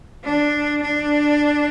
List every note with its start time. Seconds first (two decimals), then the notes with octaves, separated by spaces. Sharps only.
0.24 D4
0.82 D4